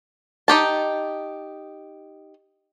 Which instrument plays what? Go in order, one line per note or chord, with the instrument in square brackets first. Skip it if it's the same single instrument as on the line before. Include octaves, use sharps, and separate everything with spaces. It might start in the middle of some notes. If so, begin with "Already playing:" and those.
[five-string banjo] D#4 G4 A5